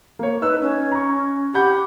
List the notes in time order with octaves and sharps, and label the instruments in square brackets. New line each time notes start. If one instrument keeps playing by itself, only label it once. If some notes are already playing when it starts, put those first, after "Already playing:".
[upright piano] A#3 C#5
[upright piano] D#4 E6 F#6 [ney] B4
[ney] C#4
[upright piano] A#5 C#6
[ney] G4 [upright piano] F#5 B5 G6